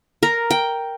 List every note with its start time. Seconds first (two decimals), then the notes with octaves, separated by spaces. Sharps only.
0.23 A#4
0.51 G5